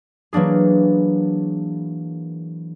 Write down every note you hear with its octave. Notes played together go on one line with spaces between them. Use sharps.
E3 F#3 A#3 D4 G#4